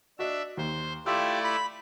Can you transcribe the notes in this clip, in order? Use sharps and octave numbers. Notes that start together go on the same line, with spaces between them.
D4 F#4 D#5 E5
D#2 C5
A3 E4 F4 G4 D5 E6
B5